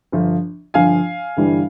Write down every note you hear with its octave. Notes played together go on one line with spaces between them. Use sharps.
G1 G2 F3
G1 G2 F3 F5 G#5
G1 G2 E3 G3